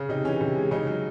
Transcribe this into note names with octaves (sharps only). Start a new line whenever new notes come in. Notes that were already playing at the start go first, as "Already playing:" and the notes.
Already playing: C#3
C3 D#4
E3 C#4
C3
G#3
C#3 D#4
F#3